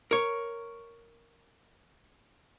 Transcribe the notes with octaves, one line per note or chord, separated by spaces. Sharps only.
A#4 C#5